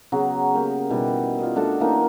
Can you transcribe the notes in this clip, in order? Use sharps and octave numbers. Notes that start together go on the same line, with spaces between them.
C#3 F#3 B3
A#3 G4
B2 D#3 E3 G3
F4 D5 D#5
A3 D4 F#4 A4
E3 A#3 C#4 D#4